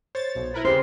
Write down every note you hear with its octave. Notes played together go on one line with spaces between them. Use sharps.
C5 C#5 A6
B1
E4 A#4 B4
C#3 G4 C5 C6